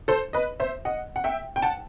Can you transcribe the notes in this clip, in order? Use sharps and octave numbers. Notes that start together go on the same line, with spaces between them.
A4 C5
B4 D#5
C5 E5
D#5 F#5
F#5
E5 G5
G5
F#5 A5